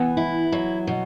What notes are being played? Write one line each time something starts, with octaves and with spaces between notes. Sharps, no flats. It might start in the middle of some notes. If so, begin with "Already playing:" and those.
Already playing: E3 B3
E4
F#3
B2